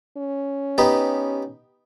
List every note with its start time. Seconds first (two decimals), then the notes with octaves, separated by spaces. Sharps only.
0.18 C#4
0.78 B3 D#4 G4